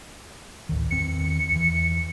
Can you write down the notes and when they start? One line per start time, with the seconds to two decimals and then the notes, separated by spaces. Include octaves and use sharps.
0.69 A1 D2 D#3
0.91 E2 D#3 C4 C#7
1.52 E2 E3